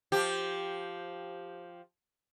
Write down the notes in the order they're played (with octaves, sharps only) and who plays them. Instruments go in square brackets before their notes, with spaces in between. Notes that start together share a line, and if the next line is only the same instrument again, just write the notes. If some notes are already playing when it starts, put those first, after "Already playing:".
[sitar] F3 G4